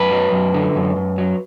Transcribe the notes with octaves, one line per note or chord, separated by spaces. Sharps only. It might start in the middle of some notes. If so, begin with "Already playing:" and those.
Already playing: F#2 B4
F#3
F#2
D3
F#2
F#2
F#3